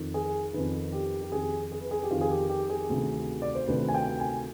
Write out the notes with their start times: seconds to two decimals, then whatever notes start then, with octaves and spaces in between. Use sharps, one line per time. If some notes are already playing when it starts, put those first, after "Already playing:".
Already playing: F2 D#3
0.14 G#4
0.54 F2 D#3 B4
0.92 G4
1.22 G4
1.32 F2 D#3 G#4
1.72 G#4
1.81 B4
1.91 G#4
2.03 G4
2.11 F2 D#3 F4
2.21 G#4
2.30 G4
2.50 G4
2.70 G#4
2.89 D2 C3 D#3
3.42 D5
3.55 C5
3.68 D2 C3 D#3 B4
3.89 G#5
3.94 G5
4.20 G#5